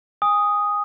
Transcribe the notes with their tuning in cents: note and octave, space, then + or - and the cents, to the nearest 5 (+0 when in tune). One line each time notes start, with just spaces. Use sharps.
G#5 -25 D#6 +0